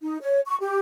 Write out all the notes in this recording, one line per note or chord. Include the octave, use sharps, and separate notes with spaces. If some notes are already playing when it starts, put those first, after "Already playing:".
D#4
C#5
C#6
G4